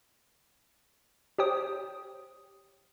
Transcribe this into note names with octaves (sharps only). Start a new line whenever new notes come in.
G4 C5 C#5 G5 D#6